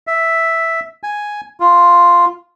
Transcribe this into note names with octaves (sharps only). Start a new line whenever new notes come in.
E5
G#5
F4